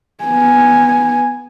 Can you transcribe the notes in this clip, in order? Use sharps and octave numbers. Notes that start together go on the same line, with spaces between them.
B3 G#5